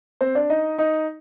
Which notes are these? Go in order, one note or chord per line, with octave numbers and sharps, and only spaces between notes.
C4 C5
D4 D5
D#4 D#5
D#4 D#5